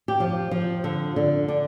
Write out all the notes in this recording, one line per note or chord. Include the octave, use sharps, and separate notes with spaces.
G4
F3
F3
D3
D3
D3